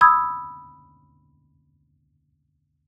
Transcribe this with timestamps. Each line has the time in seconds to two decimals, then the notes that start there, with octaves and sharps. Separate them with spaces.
0.01 B5 D#6 E6 G#6